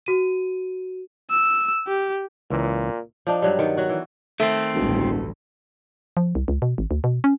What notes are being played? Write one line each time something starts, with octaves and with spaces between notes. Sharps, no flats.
F#4 D#7
E6
G4
C#2 A#2 E3
F3 D4 D#4
G2 F#3 G3
D#3 B3
F#3 F#4
E3
D#3 A3 C4
E1 A1 D2 G2
F3
C2
C#2
B2
G#1
D2
B2
C#4